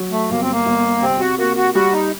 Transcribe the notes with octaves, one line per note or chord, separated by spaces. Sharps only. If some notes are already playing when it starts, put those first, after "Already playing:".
Already playing: F#3
A3
G1 A#3
C4
A#3
G1
C3 C4
F#4
A#3 F#4
F#4
G3 F#4
D#4